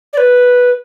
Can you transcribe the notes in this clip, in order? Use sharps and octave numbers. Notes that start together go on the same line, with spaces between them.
D5
B4